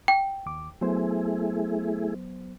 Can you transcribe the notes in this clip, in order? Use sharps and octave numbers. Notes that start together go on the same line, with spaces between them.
G5
D#2 D6
F#3 A3 B3 E4 G#4 C5